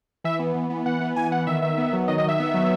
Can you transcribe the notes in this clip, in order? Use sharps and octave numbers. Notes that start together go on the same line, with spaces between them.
E3 E5
B3
E3
B3
E3 F#5
B3
E3 G#5
B3 F#5
D#3 E5
D#3 E5
B3
F#3
D#3 D#5
D#5
D#3 E5
B3
F#3